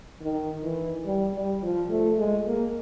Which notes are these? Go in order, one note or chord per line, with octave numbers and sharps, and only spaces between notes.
D#3
E3
G3
G3
F3
A3
G#3
A#3